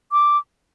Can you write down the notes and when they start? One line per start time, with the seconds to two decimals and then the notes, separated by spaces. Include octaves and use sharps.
0.12 D6